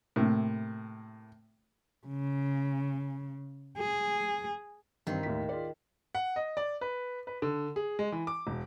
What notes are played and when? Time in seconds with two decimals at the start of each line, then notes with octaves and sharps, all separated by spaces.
0.16 A2 C3 A#3
2.07 C#3
3.77 G#4
5.07 G2 D#3 C4 C6
5.23 D#2 A2 B6
5.49 F4 G#4 D5
6.15 F#5
6.36 D#5
6.57 D5
6.81 B4
7.27 B4
7.42 D3
7.76 G#4
7.99 G#3
8.12 E3
8.27 D6
8.47 E1